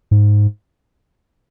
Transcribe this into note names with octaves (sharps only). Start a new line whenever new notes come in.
G#2